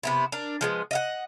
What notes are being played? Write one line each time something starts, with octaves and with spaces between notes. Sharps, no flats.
C3 B3 E4
D4 A#4
F3 G#3 B3
D#5 F5 F#5